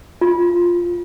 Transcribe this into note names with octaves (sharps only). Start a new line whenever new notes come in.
F4